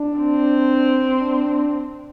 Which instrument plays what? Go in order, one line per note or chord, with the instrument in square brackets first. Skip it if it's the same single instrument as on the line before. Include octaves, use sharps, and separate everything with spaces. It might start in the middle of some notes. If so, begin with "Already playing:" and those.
Already playing: [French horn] D4
[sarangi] C4
[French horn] D4